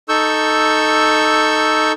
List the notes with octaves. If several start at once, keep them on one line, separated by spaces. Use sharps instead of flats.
D#4 A4 C#6 E6 G6